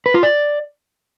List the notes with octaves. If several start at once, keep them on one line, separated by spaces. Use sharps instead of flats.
B4
F4
D5